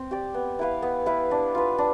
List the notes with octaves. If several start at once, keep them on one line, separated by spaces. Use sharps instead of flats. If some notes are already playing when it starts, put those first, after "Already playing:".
Already playing: C4
G4 D5
B3
E4 B4 F5
B3
E4 B4 F5
D4
F4 B4
D4